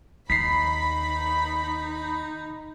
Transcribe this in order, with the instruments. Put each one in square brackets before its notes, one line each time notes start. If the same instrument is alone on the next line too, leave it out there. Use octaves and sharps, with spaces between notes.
[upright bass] D#2 [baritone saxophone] D#4 [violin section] B5 [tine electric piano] B6 C7